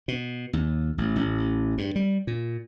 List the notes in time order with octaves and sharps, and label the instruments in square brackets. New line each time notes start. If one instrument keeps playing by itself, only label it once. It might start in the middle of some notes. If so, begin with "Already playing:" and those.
[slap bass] B2
D#2
A1
A1
G2
G3
A#2